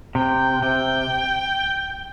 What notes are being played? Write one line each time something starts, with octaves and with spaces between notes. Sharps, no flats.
C3 G5
C3 G5